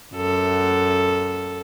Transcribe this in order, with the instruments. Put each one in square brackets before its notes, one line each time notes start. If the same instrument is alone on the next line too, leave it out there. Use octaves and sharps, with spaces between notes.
[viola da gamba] F#2 A4